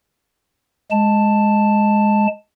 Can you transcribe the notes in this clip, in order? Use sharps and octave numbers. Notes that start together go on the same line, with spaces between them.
G#3 A5